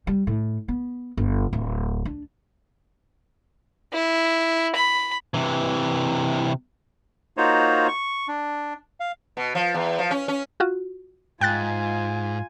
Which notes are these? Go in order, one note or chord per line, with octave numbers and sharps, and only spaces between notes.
G3
A2
B3
G1
D1
D4
E4
B5
C3 E3
A#3 D#4 F4 F#4 C5 C#5
C#6
D4
F5
B2
F3
E2
F3
C#4
C#4
F4 F#4
G#2 F4 G5 G#5 F#6 A6